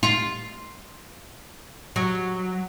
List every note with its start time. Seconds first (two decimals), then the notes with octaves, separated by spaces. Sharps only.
0.03 F4
1.96 F#3